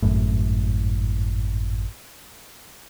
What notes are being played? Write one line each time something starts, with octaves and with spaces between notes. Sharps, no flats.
G#1 F#2 A2